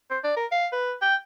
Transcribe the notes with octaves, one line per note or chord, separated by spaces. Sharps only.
C5
D5
A#4
F5
B4
G5